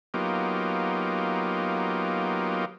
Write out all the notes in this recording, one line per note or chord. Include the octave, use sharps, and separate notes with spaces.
F#3 A#3 B3 D#4 F4 G4